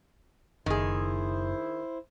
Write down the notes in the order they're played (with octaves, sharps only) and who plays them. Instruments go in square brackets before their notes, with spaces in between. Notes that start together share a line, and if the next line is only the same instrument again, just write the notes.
[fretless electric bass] F#1 [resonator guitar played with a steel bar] D#3 G#4 [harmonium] E4 C5